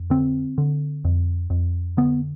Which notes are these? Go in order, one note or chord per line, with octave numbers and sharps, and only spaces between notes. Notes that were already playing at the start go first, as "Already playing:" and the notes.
Already playing: F2
D3 C4
D3
F2
F2
D3 B3